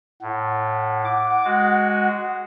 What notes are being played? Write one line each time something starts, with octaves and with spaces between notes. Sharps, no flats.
A2 F#5
D6
G#3 F#4